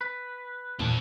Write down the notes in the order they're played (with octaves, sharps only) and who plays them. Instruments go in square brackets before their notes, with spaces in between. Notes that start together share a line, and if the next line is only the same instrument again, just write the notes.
[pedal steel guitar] B4
[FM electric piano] E2 D#3 [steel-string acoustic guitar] A#2 [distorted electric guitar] C4 A5